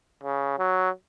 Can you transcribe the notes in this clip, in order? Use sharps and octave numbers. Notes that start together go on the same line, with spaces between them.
C#3
F#3